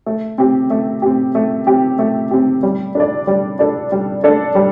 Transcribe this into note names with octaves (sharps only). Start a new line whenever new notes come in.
A3
C4 G4
A3
C4 G4
A3
C4 G4
A3
C4 G4
G3
D4 A4 D5
G3
D4 A4 D5
G3
D4 A4 D5
G3